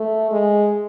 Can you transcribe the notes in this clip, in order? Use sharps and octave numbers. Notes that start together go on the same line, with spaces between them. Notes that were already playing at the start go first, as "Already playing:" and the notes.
Already playing: A3
G#3